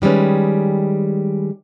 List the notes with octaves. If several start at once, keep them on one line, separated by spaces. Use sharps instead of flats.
D#3 G3 G#3 C#4 B4